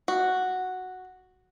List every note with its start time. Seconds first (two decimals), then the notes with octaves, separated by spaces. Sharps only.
0.08 F#4